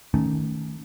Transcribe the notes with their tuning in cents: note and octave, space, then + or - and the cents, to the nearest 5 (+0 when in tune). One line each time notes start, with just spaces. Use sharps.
D#3 +0 A3 +0 C#4 +0